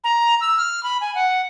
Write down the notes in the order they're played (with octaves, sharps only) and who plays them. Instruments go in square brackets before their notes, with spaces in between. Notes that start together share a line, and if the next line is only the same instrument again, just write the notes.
[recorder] A#5
E6
F6
B5
G#5
F#5